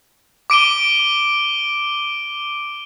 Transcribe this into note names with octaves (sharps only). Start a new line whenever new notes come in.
D6 D7 D#7 G7